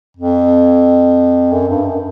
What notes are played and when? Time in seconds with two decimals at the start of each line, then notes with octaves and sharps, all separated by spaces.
0.17 F2
1.52 F#2
1.69 G2
1.86 F#2